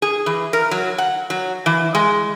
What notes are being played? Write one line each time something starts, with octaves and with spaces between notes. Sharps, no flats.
G#4
E3
A#4
F#3
F#5
F#3
E3
G#3